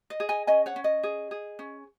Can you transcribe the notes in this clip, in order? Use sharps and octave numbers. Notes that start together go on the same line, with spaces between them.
D#5
G#4
D#5 G#5
C#4 D#5 G#5
C#5 F#5
C#4
D#5
G#4
G#4
C#4